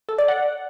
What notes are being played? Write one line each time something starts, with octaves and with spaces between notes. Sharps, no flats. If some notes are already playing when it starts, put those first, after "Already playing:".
A4
D5
F#5